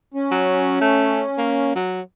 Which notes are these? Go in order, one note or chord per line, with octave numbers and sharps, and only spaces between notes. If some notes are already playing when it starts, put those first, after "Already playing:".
C#4
F#3
A3
A#3
F#3